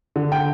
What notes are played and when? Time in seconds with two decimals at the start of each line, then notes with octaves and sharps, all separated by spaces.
0.16 D3
0.32 G5